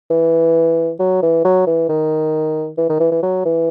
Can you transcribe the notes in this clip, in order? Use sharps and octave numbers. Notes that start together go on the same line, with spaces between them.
E3
F#3
E3
F#3
E3
D#3
E3
D#3
E3
E3
F#3
E3